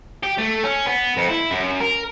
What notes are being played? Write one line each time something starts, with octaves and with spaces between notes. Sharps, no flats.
G4
A3
C#4
B3
F2
E4
F#2
A#4